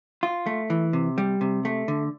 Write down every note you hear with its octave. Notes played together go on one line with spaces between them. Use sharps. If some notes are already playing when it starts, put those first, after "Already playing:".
F4
A3
E3
C3
G3
C3
A3
D3